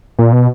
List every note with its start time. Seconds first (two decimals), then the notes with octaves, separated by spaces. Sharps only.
0.19 A#2
0.32 B2